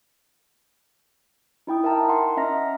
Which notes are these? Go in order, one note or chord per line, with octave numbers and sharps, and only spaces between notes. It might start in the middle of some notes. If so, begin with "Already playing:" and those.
D#4 E4 G5 D#6
A#4 E5 G5 A5 A#5
F#5 C6
C#4 D#5 E5 A#5 F6 A#6